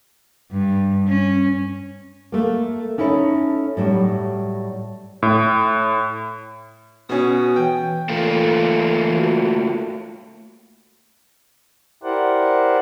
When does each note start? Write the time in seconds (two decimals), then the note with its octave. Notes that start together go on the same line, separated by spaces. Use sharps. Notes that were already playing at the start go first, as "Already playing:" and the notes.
0.51 G2
1.08 C#4
2.32 A3 A#3
2.98 C#4 D#4 E4 A4 C#5
3.77 A2 F#3 G3
5.23 A2
7.09 B2 C#4 D#6
7.56 E3 G5
8.09 A3 A#3 F4 A4
9.17 F#4
12.03 E4 G4 A#4 C5 D5 F#5